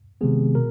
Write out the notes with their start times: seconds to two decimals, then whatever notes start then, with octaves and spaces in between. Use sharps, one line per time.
0.21 C3 D#3 G#3 B3 G#4
0.55 B2 A#4